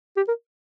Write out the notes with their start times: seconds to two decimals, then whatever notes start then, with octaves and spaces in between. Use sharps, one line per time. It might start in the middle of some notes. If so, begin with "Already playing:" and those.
0.17 G4
0.28 A#4